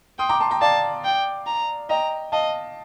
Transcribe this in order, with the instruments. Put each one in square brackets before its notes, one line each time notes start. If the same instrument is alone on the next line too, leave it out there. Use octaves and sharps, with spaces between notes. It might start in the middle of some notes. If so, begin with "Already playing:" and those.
[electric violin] G5 [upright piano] C6 D#6
[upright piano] A#5 D6
A5 C6
G5 A#5
[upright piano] D5 F5 [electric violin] A5
[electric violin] G5
A#5
[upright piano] D#5 G5 [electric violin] A#5
[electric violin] D#5 [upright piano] F5 A5